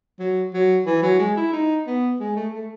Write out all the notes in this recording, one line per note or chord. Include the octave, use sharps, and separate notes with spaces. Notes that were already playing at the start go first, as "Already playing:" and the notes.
F#3
F#3
E3
F#3
G#3
E4
D#4
B3
G#3
A3
A3